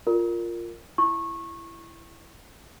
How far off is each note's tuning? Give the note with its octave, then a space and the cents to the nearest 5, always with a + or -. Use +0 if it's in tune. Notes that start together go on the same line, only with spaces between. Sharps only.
F4 +0 A#4 -5 D5 +0
E4 +15 C#6 -20